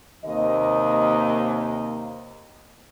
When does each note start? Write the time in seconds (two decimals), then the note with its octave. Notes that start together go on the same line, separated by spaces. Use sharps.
0.25 D#2 C3 A#3 D#5